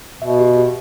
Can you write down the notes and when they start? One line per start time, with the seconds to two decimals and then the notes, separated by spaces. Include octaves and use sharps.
0.22 B2 E5
0.39 G4
0.56 G4